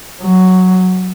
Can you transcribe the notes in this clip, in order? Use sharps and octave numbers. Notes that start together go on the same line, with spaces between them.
F#3